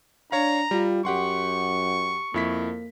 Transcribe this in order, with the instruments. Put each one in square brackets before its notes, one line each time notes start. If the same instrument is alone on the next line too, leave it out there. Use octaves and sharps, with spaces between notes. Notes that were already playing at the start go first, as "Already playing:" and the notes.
[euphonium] D4 [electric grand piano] C#5 F5 [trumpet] A#5
[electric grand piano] G3 [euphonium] F4
[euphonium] F#2 [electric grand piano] G4 F#5 C6 [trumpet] C#6
[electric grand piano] F2 E4 B6 [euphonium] A#3